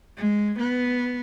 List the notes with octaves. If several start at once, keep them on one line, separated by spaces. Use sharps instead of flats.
G#3
B3